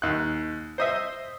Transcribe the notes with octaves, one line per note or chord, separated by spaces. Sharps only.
D#2 F#6
C5 D#5 E5